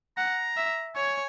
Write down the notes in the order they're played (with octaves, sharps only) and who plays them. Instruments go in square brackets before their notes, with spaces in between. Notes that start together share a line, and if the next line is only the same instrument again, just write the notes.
[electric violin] F#5 [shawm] A#5
[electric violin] E5
[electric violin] C#5 [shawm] G#5